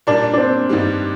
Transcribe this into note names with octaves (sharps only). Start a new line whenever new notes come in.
A#2 G3 A#3 D4
D4
C4
G2 D#3 G3